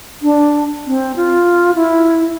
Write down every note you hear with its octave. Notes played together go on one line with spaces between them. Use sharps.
D4
C4
F4
E4